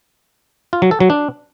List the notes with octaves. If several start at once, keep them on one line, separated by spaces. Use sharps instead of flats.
F4
F#3
A4
F#3
D4